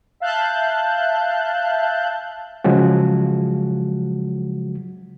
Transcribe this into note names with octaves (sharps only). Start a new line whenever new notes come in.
E5 F5 A5 F#6 G6
C#3 F3 F#3 G#3 F#4